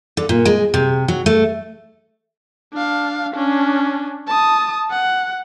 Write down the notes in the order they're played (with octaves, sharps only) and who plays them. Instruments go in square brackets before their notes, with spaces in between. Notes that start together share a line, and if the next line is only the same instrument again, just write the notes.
[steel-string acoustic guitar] D3
A#2
G#3
C3
F#3
A3
[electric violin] D4 F5
C#4 D4
A5 D#6
F#5